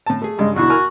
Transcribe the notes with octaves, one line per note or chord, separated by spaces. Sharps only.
A2 A5
A3 G#4
G2 C#3 G#3
E2 B2 D3 E4 F#4
A#4 G#5 F6